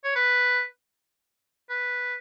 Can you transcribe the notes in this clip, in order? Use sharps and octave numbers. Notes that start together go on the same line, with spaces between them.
C#5
B4
B4